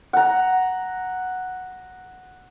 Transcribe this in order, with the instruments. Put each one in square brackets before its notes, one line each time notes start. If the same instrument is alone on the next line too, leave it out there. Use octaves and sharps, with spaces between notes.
[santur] F#5 A#5